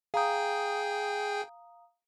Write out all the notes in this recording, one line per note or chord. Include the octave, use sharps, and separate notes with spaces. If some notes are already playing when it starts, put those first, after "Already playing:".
G#4 F5 G5 A#5 D#6